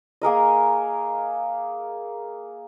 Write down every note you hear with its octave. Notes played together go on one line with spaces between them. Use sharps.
A#3 G#4 A#4 D#5